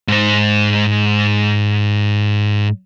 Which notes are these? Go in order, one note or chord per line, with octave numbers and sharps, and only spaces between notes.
G#2 C5